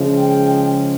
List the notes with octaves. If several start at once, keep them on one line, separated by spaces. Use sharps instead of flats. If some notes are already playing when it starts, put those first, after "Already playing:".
Already playing: C#3 F3 G#3
G5